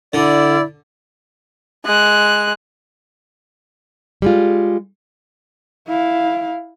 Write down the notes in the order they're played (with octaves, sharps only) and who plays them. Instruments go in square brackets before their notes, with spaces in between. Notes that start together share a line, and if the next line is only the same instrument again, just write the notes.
[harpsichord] D3 [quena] E4 [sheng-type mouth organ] D5
[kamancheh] G#3 F#6
[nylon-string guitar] G3 G#3 F4
[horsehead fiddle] E4 F5